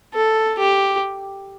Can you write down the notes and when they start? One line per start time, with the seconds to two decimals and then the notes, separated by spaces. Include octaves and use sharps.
0.14 A4
0.59 G4